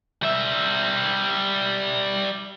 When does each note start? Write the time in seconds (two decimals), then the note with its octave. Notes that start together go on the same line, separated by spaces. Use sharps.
0.23 G3 E5